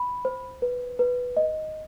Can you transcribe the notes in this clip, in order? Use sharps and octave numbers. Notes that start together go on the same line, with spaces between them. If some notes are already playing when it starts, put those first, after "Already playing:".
Already playing: B5
C5
B4
B4
D#5